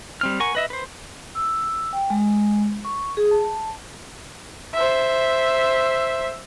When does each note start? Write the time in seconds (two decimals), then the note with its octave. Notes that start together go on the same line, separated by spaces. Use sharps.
0.21 G3 C4 F6
0.40 A#4 F#5 G#5 C#6
0.55 B4 D#5 E5
0.70 B4 C5
1.35 E6
1.93 G5
2.10 G#3
2.85 C#6
3.17 G#4
3.31 A5
4.74 C5 E5